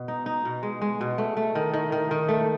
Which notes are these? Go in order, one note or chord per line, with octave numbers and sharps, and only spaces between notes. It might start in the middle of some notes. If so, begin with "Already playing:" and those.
Already playing: B2
D#4
D#4
B2
G#3
G#3
B2
A3
A3
D#3
D#3
D#3
D#3
A3